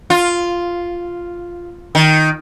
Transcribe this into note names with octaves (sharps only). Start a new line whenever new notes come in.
F4
D#3